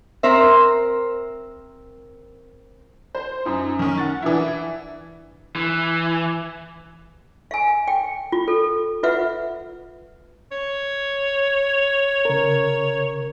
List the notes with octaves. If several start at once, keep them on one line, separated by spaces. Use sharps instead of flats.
C4 A#4 C5 E5
C5
F#2 D#4
D#3 C#4
F#5 A6
E3 D4 E4
E3
F5 G#5
G5
F4
A4
F4 B4 E5 F#5
C#5
C#3 A#4